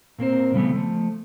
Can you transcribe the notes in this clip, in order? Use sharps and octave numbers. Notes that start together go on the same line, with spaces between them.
A#2 A#3 C4 C5
C#3 E3 G3 A3 B3
F3 A3